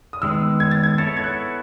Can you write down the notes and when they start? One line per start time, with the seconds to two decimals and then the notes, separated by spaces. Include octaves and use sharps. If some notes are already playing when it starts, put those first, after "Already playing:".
0.13 D#6
0.22 D#3 G#3 B3 E6
0.60 G#6
0.71 A6
0.83 G#6
0.98 B3 E4 A4 C#5 A6
1.17 G#6
1.24 F#6